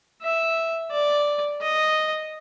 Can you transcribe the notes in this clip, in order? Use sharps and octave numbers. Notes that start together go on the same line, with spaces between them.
E5
D5
D#5